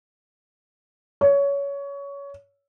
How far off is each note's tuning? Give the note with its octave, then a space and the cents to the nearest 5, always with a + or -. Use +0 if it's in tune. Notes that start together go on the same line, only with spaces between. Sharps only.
C#5 +20